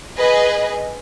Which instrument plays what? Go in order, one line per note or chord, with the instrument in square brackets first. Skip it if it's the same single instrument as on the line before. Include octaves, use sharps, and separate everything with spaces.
[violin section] G#4 B4 D#5